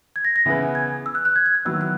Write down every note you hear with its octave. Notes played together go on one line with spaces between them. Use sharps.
G#6
A#6
A#6
C#3 E3 B3 E4 B4
G#6
E6
F#6
F#6
G#6
G#6
F#6
D#3 F#3 B3 E4 E6
F#6